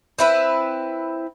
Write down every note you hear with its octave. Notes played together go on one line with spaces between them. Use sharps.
C4 E4 B4